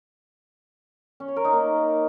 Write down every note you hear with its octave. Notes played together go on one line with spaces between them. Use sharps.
C#4
C#5
A#4
D#4
A#3